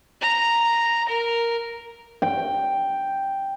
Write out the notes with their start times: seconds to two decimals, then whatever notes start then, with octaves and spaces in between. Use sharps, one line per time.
0.21 A#5
1.08 A#4
2.22 G5